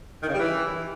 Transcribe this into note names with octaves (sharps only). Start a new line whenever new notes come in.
D#3
C#3
G3
E3